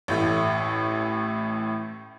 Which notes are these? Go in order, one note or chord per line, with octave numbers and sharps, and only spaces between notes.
A1 A2 A3